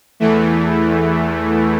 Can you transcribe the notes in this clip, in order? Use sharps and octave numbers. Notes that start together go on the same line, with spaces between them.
E2 E3 A3